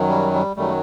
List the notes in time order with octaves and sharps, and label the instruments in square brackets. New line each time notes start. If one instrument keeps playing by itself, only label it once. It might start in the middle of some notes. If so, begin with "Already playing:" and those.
Already playing: [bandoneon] F#2 D#3 F#3
G3
G3
F#2 D#3 F#3 G3 A3